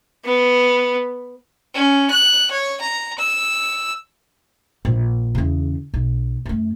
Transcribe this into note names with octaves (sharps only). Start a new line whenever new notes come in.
B3
C#4
F#6
C#5
A#5
E6
A#1
E2 C#3
B1
F#2 A3